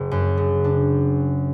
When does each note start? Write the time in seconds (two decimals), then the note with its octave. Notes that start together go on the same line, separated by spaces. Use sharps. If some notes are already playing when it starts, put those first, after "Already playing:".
Already playing: F#1 C#3
0.11 F#2
0.37 C#3
0.64 D4